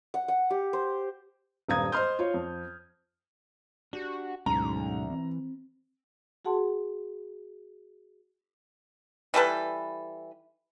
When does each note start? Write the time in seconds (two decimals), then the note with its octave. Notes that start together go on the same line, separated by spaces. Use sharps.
0.14 F#5
0.28 F#5
0.50 G4
0.73 C5
1.68 D#1 G2 F5 A#5 D#6 G#6
1.92 C5 D#5 C6 F6 G6
2.19 F4 C#5
2.34 F2
3.93 D4 F#4 G4
4.46 D2 G#2 B2 F#3 C#4 A#5
5.10 E3 C4
6.45 F#4 G#4 F#5 A5 C6
9.34 E3 G3 A4 B4